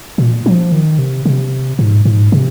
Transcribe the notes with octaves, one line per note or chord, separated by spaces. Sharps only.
A#2
F3
D#3
C3
C3
G#2
G#2
C3